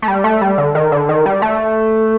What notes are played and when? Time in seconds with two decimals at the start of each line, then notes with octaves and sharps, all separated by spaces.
0.02 A3
0.08 G3
0.24 A3
0.41 G3
0.58 D3
0.75 D#3
0.92 D3
1.09 D#3
1.26 G3
1.42 A3